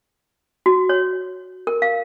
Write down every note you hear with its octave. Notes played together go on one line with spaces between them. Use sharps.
F#4
C#5
A#4
F5